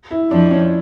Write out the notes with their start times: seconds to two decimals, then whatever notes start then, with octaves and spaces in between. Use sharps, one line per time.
0.11 E4
0.30 F2 F3 D4
0.51 C#4